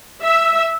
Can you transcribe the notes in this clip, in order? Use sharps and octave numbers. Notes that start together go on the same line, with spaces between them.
E5